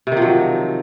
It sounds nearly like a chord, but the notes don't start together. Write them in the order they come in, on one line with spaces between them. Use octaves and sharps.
C3 D#3 F3 F#3